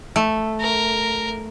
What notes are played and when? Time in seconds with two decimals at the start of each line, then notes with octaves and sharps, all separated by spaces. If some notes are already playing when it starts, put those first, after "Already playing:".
0.16 A3
0.61 A#4